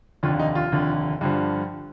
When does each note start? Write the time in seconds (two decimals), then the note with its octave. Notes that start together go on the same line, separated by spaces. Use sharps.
0.23 F1 D#2 D3 F4
0.39 D#4
0.55 F4
0.72 F1 D#2 D3
1.21 G2 D3 F3